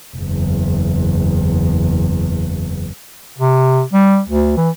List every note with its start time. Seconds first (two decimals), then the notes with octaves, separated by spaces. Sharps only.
0.17 F#1 E2
3.38 C3
3.93 G3
4.29 D2
4.57 E3